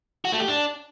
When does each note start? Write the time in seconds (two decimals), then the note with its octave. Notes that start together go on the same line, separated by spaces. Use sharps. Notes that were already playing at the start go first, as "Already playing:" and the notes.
0.25 F#4
0.32 A3
0.40 G4
0.48 D4